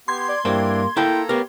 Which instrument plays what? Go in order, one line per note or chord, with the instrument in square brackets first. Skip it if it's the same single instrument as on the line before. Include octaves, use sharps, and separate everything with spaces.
[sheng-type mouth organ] B3 G4 [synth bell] C6 G#6
[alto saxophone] D5
[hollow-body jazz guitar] G2 C5 G5 [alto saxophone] A#3 [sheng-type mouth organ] D4 E4 D5
[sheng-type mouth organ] A#3 A4 A#5 [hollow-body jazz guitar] E4 F5 A5 [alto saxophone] G5
[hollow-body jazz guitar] B3 A#4 [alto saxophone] G4 [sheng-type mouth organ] C#5 F5